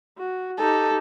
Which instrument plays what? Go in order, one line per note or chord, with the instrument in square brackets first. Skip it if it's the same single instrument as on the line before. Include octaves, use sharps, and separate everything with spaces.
[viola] F#4
[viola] D#4 G4 [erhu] A4